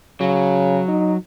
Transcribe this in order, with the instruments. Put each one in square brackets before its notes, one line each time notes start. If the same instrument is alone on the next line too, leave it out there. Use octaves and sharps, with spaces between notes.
[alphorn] C#3 [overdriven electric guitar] F#3
[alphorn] D#4